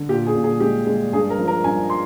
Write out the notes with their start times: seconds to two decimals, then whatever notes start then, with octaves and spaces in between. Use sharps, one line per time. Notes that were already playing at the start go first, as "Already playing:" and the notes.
Already playing: D3
0.09 A#2 G4
0.27 G#4
0.35 A#2
0.44 G#4
0.60 G#3 G4
0.87 G#3
1.12 G2 G#4
1.30 A#4
1.38 F3
1.48 A#4
1.64 G2 G#5
1.90 C6